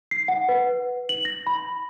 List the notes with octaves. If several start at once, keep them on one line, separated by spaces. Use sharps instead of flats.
C7
F#5
B4
F#7
A#6
B5